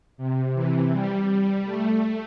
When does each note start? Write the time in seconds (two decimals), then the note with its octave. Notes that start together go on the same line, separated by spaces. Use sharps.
0.17 C3
0.54 E3
0.92 G3
1.65 A3